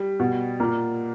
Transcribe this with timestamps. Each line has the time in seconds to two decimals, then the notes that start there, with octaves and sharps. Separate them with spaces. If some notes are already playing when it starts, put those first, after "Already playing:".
Already playing: G3
0.20 B2
0.60 A#2 A#3